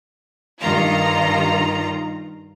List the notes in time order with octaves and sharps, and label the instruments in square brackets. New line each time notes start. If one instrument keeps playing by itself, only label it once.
[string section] G2 D#3 F4 A#5